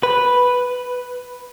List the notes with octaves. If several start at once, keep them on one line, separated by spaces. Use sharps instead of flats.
B4